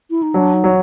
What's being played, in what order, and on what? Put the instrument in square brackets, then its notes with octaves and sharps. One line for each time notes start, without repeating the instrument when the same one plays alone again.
[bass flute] E4
D#4
[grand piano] F#3 [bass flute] D4
[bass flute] D#4
[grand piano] F#3